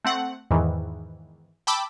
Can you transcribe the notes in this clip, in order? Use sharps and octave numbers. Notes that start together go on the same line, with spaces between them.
A3 C4 F#5
E2 G#2 D#3 E3
G5 A5 B5 D6 E6